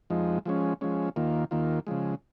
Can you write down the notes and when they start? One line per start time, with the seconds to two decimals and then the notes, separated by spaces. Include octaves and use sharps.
0.10 F2 F3 G#3 D#4
0.45 F3 G#3 C#4
0.81 F3 G#3 C#4
1.16 D#2 D#3 A#3 F4
1.51 D#2 D#3 A#3 F4
1.87 C#3 F3 G#3